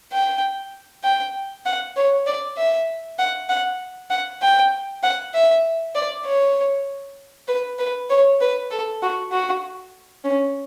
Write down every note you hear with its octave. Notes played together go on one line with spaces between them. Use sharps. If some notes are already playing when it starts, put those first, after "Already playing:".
G5
G5
F#5
C#5
D5
E5
F#5
F#5
F#5
G5
F#5
E5
D5
C#5
B4
B4
C#5
B4
A4
F#4
F#4
C#4